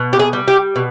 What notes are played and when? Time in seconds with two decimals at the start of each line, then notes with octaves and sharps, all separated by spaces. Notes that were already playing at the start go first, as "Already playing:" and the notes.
Already playing: B2
0.13 G4
0.19 G#4
0.33 G3
0.48 G4
0.76 B2